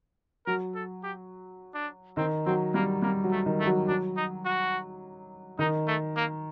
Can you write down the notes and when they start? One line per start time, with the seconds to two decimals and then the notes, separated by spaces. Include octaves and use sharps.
0.46 F#3 A#4
0.75 A4
1.03 G4
1.74 D4
2.17 D#3 C4
2.46 F#3 C4
2.74 G3 A#3
3.02 G3 A#3
3.24 F#3
3.32 A3
3.46 D#3
3.60 A3
3.66 F#3
3.88 F#3 D4
4.16 D#4
4.45 F#4
5.59 D#3 D#4
5.88 A3
6.16 A#3